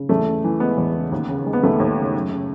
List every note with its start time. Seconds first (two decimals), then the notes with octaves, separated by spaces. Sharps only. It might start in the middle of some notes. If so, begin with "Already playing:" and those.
Already playing: C#3
0.09 E2 A3
0.26 C#3
0.44 E3
0.60 G#3 B3
0.78 E2
0.95 C#3
1.12 D#2
1.29 C#3
1.46 G#3
1.53 B3
1.63 D#2 A3
1.80 D#2
1.97 C#3
2.14 F#2
2.31 C#3